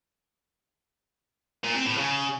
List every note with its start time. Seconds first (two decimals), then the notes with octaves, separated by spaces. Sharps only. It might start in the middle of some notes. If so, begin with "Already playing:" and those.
1.64 A#2
1.75 C4
1.86 A2
1.97 C#3